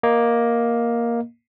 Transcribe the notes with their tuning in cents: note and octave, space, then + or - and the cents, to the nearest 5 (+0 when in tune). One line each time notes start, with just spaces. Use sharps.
A#3 +10 D#5 +5